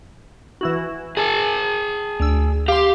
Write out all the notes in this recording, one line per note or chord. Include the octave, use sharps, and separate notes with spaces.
E3 E4 F#4
G#4 A5
D2 E6
G4 F5 C6